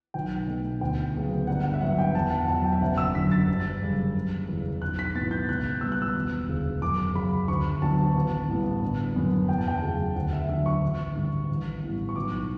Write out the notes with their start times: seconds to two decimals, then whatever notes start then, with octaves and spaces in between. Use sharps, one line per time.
0.14 B1 G5
0.48 B2 A3
0.81 D2 G5
1.14 C#3 F#3 B3
1.47 G1 F#5
1.64 F#5
1.74 E5
1.81 G2 F#3 B3 F#5
1.98 G5
2.14 E2 A5
2.31 F#5
2.48 B2 F#3 A5
2.65 G5
2.73 E5
2.81 F#1 F#5
2.98 E6
3.14 F#2 D3 F#3 B6
3.31 A6
3.48 G1
3.81 F#2 C#3 G3
4.14 F#1
4.48 E2 C#3
4.82 B1 F#6
4.99 B6
5.15 A2 F#3 B3 A6
5.31 G6
5.49 C#2 F#6
5.81 B2 G3 B3 E6
5.92 F#6
6.02 E6
6.15 E1
6.49 D2 C#3
6.82 F#2 D6
7.15 C#3 F#3 B5
7.48 D2 C#6
7.82 D3 F#3 B3 A5
8.16 A1
8.48 A2 G3 B3
8.82 G1
9.16 F#2 D3 F#3 B3
9.49 E2 G5
9.58 A5
9.68 G5
9.82 C#3 F#3 A3
10.16 D2 F#5
10.33 E5
10.49 D3 F#3 E5
10.66 C#6
10.83 A1
11.15 G2 D3 G3
11.50 A1
11.83 A2 G3 B3
12.09 C#6
12.16 B1 D6